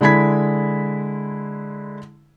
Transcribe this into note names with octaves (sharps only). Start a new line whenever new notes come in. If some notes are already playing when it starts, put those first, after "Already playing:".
D3 G#3 E4 B5 G#6 B6